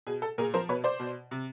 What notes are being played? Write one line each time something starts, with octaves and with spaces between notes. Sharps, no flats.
B2 G#4
A4
A#2 G#4 A#4
F3 A#4 C5
B2 B4 C#5
C5 D5
B2
C3